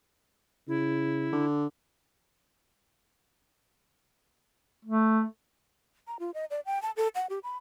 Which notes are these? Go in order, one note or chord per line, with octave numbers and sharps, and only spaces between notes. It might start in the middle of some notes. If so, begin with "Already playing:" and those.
C#3 E4
D3
A3
A#5
F4
D#5
D5
G5
A5
A4
F#5
G4
B5